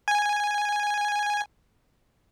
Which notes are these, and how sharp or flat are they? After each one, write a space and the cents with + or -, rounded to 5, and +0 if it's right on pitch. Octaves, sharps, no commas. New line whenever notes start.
G#5 -5